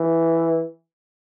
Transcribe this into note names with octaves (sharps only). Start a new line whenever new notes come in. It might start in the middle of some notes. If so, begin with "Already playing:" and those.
Already playing: E3